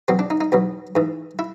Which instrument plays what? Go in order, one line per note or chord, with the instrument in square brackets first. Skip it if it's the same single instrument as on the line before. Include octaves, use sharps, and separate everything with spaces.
[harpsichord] E2 B2 F#3 C4
D4
D#4
D#4
E2 B2 F#3
G#2 E3
E4